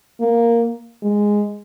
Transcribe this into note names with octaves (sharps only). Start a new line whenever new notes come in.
A#3
G#3